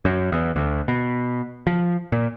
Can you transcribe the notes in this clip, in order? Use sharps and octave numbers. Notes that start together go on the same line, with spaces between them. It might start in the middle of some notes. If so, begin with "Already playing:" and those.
F#2
E2
D2
B2
F3
A#2